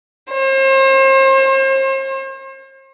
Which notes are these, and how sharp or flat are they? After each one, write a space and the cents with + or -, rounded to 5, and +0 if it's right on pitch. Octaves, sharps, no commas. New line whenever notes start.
C5 +40